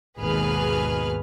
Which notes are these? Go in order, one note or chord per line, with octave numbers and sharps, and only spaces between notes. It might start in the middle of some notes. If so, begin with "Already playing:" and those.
G#1 D#2 B2 G#4 B4 F6